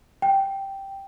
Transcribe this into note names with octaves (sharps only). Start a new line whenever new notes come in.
G5